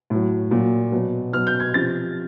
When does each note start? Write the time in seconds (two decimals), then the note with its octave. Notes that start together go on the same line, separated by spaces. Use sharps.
0.10 A2 F#3
0.51 A#2 F#3
0.92 B2 F#3
1.33 B2 F#3 F6
1.47 G6
1.60 G#6
1.74 C3 F3 A6